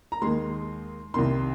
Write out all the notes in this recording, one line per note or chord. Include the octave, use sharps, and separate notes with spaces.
A#5
D#2 D#3 G#3 C6
C2 C3 D#3 C6